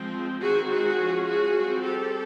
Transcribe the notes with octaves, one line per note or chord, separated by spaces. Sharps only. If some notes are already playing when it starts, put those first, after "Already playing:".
Already playing: F3 G#3 C4
D#3 G#3 C4 F#4 G#4
F#4 G#4
F3 G#3 C#4
F#4 G#4
G3 C4
G4 A4